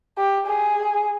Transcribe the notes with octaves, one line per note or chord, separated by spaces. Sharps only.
G4
G#4